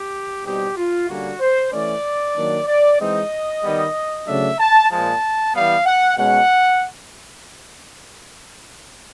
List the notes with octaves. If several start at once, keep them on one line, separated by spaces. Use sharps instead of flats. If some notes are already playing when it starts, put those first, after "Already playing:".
Already playing: G4
B2 G3 C4 D#4 G4
F4
D3 G3 A#3 C#4 F#4
C5
E3 A3 C#4 D5
D#3 F#3 A#3 D4
D5
E3 G#3 C4 D#4 D#5
D#3 G3 B3
C#3 F#3 A3 D4 E5
A5
A#2 F3 G#3 A5
E3 G3 B3 F5
F#5
B2 G#3 C#4 F#5